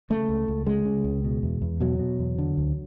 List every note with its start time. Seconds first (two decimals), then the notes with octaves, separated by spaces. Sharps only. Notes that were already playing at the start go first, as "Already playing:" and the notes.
0.10 C#3 A3
0.29 C#2
0.48 C#2
0.67 C#3 G#3
0.85 C#3
1.04 C#2
1.24 B2
1.43 E2
1.62 E2
1.80 B2 F#3
1.99 B2
2.19 E2
2.38 D3
2.57 D2